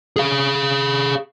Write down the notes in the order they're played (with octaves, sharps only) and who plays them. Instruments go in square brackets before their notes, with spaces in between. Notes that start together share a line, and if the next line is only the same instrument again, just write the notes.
[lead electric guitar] G#4 F5